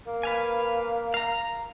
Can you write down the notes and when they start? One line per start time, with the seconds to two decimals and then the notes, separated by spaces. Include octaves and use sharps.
0.07 A#3
0.23 B4 F5 G#5
1.14 F5 A#5